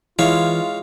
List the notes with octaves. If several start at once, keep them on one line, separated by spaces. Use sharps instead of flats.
E3 G#3 E4 F4 C#5 F5